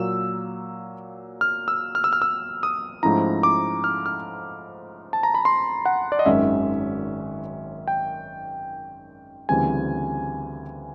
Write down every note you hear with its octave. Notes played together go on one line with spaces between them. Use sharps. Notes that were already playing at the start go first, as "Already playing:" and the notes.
Already playing: A#2 F#3 A#3 E6
F6
E6
F6
E6
F6
E6
D#6
G#2 F3 A3 C#4 E4 A#5
D6
F6
F6
A5
A#5
B5
C6
F#5
D5
D#5
G#1 F#2 D#3 G#3 C#4 E5
G5
D2 C#3 E3 G3 C4 G#5